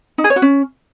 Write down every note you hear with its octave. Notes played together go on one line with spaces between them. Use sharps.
D#4
G#4
C#5
F#4
C#4